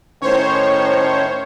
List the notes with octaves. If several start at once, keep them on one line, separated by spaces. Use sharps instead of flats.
A2 D#3 C#4 C5 C#5